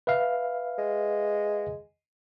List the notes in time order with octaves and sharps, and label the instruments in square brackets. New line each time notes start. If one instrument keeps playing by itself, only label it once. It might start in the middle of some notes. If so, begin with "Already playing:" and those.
[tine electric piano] B4 E5 F5
[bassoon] G#3